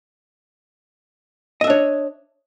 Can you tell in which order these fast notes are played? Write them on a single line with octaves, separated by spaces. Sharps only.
D#5 E5 D4 C#5